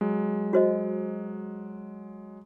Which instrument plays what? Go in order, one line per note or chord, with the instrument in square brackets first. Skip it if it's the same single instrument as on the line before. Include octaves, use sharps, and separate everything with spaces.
[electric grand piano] F#3 G#3
[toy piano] F#4 C5 D#5